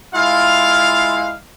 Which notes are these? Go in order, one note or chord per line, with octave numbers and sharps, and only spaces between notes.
G#3 E4 F4 F5